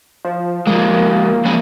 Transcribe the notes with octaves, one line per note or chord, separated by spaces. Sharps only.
F3
F3 G#3 A#3
F3 G#3 C#4